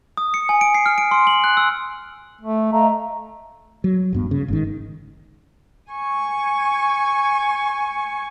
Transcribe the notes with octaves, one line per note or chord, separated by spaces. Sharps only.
D#6
C#7
G#5
D7
C7
F6
D7
C6
F#7
F#6
E6
A3
A3 D#5 F5 A#5
F#3
D#1 G2 B3
C#3
G1 G#2 D#3
G#5 C#6